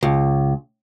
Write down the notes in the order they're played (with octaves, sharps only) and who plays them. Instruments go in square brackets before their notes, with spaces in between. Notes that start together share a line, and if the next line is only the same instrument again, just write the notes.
[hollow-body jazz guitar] C#2